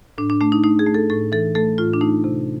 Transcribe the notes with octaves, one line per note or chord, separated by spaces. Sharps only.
A2 D4
D4
A3 D4
D#4
A3 D#4
G#4
A3
A4
A2 A4
E3 A4
A3 A4
A2 F4
D4
A3 D#4
C3